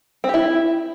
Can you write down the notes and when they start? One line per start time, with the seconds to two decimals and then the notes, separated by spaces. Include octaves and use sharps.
0.24 C4
0.29 G4
0.34 E4